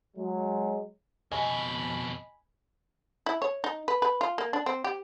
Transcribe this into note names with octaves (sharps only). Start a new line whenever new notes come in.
F#3 G#3
F2 B2 D#5 G#5 B5
E4
C#5
D#4
B4
B4
F4
A#3
D4
C4
G4